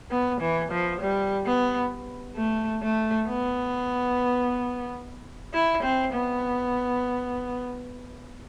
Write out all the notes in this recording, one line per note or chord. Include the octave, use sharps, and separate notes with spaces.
B3
E3
F3
G3
B3
A3
A3
B3
E4
C4
B3